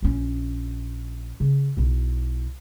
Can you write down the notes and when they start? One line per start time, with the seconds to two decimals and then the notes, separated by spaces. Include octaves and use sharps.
0.02 A#1 C#4
1.40 C#3
1.77 B1 E4